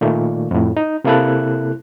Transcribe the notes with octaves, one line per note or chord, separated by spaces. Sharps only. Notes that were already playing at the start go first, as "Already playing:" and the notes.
A#2 D#3 A3 A#3
F2 A2
D#4
C3 A#3 E4 A4 F#6